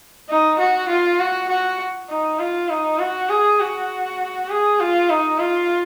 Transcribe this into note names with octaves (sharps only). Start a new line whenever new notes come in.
D#4
F#4
F4
F#4
F#4
D#4
F4
D#4
F#4
G#4
F#4
G#4
F4
D#4
F4